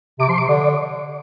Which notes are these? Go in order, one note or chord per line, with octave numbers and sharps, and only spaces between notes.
C3 D6
F3 C6
C3 D6
D3 D5
D5